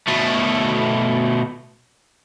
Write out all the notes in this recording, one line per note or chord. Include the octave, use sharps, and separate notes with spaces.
B2 A3